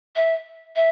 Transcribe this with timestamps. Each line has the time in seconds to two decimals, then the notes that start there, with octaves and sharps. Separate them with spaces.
0.16 E5
0.76 E5